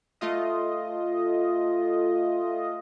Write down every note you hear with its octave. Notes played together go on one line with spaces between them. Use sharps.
A3 F4 D#5